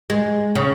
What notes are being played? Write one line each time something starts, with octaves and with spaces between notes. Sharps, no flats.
G#3
C#3